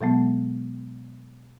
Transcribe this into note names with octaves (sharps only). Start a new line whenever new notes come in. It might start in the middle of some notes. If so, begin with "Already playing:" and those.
B2 F#3 G#3 B3